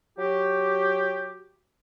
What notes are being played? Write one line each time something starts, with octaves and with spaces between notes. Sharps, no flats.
F#3 F#4 G4